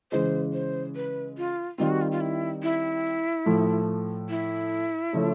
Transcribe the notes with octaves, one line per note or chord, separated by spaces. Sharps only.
C#3 E3 G#3 C5
C5
B4
F4
D#3 G3 C4 F4
F#4
F4
F4
E4
E4
A2 F3 A3
E4
C#3 F3 A3 C#4